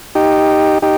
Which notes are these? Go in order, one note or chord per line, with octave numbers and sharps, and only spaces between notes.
D#4 G4
D#4 G4